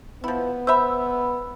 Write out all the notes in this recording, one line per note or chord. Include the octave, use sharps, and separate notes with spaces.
F3 B3 E4
C5 E5 B5 E6